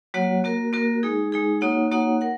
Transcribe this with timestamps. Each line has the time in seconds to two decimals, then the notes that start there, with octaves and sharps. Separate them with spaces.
0.14 F#3 A#3 F#4 C#5 F#5
0.44 A#3 F#4 A#4
0.73 A#3 F#4 A#4
1.03 G#3 D#4 G#4
1.32 G#3 D#4 G#4
1.61 A#3 D#4 F#4 C#5 F#5
1.91 A#3 D#4 F#4 C#5 F#5
2.21 A#4 F#5